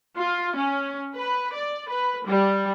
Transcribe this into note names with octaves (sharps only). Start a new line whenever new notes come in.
F4
C#4
B4
D5
B4
G3